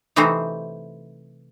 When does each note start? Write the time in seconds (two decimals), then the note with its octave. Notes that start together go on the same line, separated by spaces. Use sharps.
0.16 C3 E3 A3 C4 D#4 C5